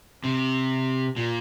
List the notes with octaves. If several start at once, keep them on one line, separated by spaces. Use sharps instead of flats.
C3
A#2